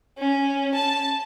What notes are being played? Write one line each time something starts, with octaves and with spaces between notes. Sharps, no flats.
C#4
A5